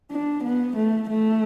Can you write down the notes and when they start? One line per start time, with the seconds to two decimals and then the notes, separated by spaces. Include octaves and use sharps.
0.12 D4
0.44 B3
0.77 A3
1.10 A3